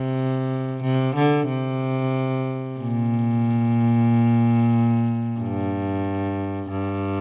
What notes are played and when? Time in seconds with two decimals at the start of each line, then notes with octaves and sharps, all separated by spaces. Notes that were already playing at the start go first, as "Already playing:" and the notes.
Already playing: C3
0.82 C3
1.15 D3
1.48 C3
2.78 A#2
5.39 G2
6.70 G2